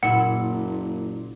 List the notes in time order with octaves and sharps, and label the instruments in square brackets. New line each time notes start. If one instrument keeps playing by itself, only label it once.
[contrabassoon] F#1 [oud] A#2 E4 [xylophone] F#5